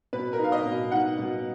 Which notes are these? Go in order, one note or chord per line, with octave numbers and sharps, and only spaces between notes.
B2 B4
A#4
D#4 F5
D#5
B2
D#4 F#5
B2